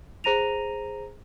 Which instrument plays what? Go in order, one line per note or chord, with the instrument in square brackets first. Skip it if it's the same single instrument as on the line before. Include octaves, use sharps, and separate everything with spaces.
[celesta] G#4 C5 A#5 A#6 D#7 F7